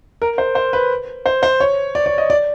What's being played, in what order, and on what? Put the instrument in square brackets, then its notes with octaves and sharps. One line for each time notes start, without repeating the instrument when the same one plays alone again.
[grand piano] A#4
C5
C5
B4
C5
C5
C#5
D5
D5
D#5
D5